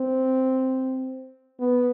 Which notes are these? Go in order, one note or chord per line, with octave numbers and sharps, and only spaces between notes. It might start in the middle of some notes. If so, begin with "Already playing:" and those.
Already playing: C4
B3